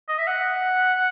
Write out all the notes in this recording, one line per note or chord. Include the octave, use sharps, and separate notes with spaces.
D#5
E5
F#5